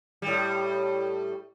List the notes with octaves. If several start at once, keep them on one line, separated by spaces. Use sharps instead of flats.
A2 G3